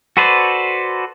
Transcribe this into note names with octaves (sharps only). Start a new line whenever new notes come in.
F#4 A4 B4 C5 D5